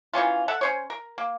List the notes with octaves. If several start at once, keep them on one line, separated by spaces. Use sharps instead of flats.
D#3 E3 C#4 F4
A4 E5 F#5
C#4 C5 C#5
A#4
A#3